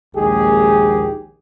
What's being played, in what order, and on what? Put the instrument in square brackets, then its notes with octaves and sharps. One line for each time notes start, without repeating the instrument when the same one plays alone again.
[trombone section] A#1 D#2 G#3 G4 G#4